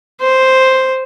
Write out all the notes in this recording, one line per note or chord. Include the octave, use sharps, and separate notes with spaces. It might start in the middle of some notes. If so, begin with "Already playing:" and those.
C5